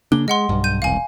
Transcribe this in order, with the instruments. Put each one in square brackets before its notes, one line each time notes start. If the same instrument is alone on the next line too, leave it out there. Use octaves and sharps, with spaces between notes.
[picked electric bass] C#3 A#3 D4 [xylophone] G7
[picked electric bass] G#3 [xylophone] D#5 F#5 C6
[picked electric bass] B1 G2
[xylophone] G6 D#7
[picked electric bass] E1 C2 [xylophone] F5 G#5